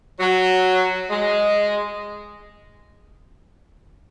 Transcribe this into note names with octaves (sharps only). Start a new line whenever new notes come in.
F#3
G#3